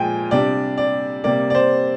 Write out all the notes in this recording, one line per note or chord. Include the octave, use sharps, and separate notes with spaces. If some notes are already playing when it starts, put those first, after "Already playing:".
Already playing: A#2 F3 G#3 G5 G#5
C3 G3 D4 D5
D5
C3 G3 A#3 D5
D5
C5